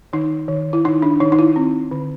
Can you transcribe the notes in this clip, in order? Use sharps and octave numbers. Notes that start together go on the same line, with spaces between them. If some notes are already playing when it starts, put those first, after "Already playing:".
D#3 D#4
D#3
E4
D#3 D#4
D4
D#3 D#4
D#4
E4
C4
D3